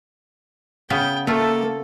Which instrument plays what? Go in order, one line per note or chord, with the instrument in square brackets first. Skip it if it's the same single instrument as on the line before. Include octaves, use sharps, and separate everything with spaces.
[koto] C#3 B3 [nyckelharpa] G5
[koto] A3 F4 [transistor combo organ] A#3 [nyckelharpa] A4